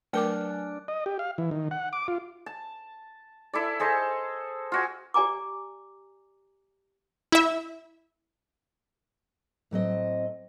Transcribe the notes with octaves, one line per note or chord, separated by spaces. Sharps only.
F#3 A3 D4 A#4 G#5 D6 F6
D#5
G4
F5
E3
D#3
F#5
D6
F4
A5
E4 A4 D5
G#4 A4 C5 D#5
F4 F#4 G#5
G4 D5 G#5 A#5 D6
E4 E5
A2 F#3 C4 D#5